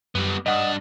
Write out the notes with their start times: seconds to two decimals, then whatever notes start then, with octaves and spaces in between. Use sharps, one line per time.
0.15 F#2 G3 B3
0.46 G2 D4 D#5 F#5 D#6